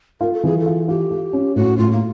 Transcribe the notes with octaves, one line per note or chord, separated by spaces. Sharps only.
F4 A#4
A4
E3 G#4
A4
F4
F4 G4
F4
C#4
A2 F#4
A2 F4
A#3